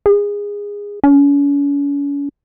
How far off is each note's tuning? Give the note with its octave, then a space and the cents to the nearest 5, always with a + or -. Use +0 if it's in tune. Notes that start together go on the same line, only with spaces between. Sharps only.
G#4 -20
C#4 +40